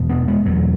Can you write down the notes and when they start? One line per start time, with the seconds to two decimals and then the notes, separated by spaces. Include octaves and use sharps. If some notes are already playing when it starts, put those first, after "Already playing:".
Already playing: E2 B2
0.10 B3 D4
0.28 G#3 B3
0.46 E2 B2 F#3 A3